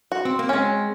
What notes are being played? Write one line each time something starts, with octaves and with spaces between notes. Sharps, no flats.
F#4
C4
A#3
G#3 C4 C#4